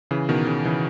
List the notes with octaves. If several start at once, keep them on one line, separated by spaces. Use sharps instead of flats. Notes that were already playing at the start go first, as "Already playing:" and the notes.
C#3 E3
B2 D#3
C#3
C#3 E3